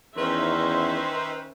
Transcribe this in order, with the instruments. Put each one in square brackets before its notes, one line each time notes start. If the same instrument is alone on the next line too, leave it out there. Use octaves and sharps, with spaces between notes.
[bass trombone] E2 [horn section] D#3 B4 C5 [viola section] C#4 D#4 E5 [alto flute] C6